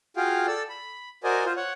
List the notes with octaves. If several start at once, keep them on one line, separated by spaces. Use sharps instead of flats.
F4 F#4 G#4 F5 G5
A4 D5 E6
B5
F#4 A#4 C5 D5 D#5 G#5
F4 C5
C#5 F#5